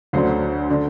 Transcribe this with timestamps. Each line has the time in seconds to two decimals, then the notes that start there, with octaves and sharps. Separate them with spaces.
0.13 D2 D3 F#3 C5
0.70 D3